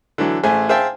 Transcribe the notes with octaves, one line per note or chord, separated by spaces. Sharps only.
D3 E3 F#3
A1 A3 G#4 C5 G#5
G#4 C5 E5 F5 G5 A5